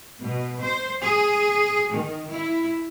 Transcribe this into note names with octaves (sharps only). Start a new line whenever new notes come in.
B2
C5
G#4
D#3
E4